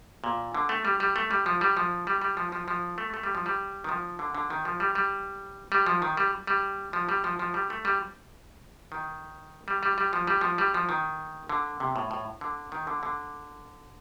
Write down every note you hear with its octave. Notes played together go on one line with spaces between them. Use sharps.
A#2
D3
A3
G3
G3
A3
G3
F3
G3
F3
G3
G3
F3
F3
F3
A3
A3
G3
F3
G3
D#3
F3
D3
D3
D#3
F3
G3
G3
G3
F3
D#3
G3
G3
F3
G3
F3
F3
G3
A3
G3
D#3
G3
G3
G3
F3
G3
F3
G3
F3
D#3
D3
C3
A2
A2
D3
D#3
D3
D3